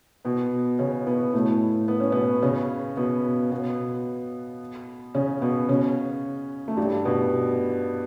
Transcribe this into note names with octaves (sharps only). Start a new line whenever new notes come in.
B2 B3
C#3 C#4
B2 B3
A2 A3
B3
C#4
B2 B3
C#3 C#4
B2 B3
B2 B3
C#3 C#4
B2 B3
C#3 C#4
A3
G2 G3
B2 B3